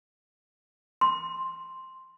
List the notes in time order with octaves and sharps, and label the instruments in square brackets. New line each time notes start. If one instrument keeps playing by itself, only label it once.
[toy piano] C6